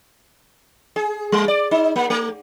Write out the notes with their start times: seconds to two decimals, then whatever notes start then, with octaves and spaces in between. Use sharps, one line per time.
0.96 G#4
1.32 G3
1.48 D5
1.71 D#4
1.96 A#3
2.10 A3